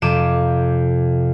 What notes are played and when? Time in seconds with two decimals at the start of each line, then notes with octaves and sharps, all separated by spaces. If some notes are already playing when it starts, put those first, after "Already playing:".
0.02 F2 C3 D6 D#7 E7